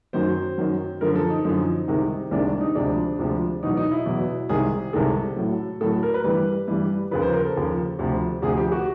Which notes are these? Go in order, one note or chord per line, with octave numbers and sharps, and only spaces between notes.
F#2 D#3 F#3 C5
F#2 D#3 F#3
F#2 D3 F3 A#4
A4
D#4
F#2 D3 F3
C2 C3 D#3 G#3
C2 C3 D#3 G#3 D4
D4
D#4
D2 C3 F3 G#3 D4
D2 C3 F3 G#3
E2 B2 F#3 D#4
D#4
E4
E2 B2 F#3
C2 C3 D#3 G#3 G#4
C2 C3 D#3 G#3 A4
A2 F#3
A2 F#3 A4
A4
A#4
B4
G2 E3 G3
G2 E3 G3
D#2 C#3 F3 B4
C5
A#4
A4
D#2 C#3 F3
D2 C3 F3
D2 C3 F3 G#4
G4
F#4